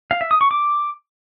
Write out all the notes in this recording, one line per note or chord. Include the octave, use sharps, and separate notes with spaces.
F5
E5
D#6
C#6
D6